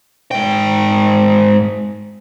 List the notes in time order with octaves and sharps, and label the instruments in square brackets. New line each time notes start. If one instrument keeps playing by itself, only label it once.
[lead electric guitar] G#2 G5